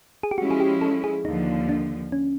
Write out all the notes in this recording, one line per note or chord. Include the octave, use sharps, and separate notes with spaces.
G#4
G4
F3 G#3 C#4 E4 F#4
G#4
G4
A4
G#4
D#2 D3 F3 D#4
D4
C#4